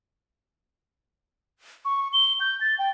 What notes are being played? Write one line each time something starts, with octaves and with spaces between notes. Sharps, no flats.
C#6
G7
G6
A6
G5